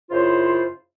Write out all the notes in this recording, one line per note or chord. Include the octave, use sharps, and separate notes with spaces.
F#2 C#3 E4 F4 C5